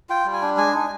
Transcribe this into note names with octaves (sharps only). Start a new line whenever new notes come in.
F4 G5
G3
G#5
D4
G#3 G#5
D#4